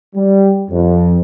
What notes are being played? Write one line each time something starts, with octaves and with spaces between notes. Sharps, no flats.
G3
F2